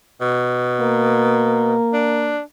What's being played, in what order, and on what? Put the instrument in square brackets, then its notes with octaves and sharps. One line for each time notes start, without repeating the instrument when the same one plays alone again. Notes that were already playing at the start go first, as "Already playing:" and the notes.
[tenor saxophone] B2
[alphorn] A#3
[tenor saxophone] D4